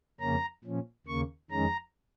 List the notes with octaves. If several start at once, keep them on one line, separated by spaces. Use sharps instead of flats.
F2 C#3 A#3 C#4 A#5
A#2 F3 C#4
D#2 C#3 A#3 C#6
F2 D#3 G#3 C#4 A#5